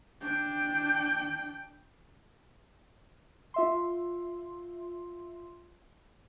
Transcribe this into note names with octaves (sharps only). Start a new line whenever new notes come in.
D4 G5
F4 E5 C6